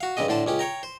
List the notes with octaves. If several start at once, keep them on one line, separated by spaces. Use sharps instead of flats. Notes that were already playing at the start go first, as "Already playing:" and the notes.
F#4 F5
G2 C#3 C4 G4 D#5
A2 D3 C5 A5
C#2 C#4 G4
C#5 G5 A#5
C5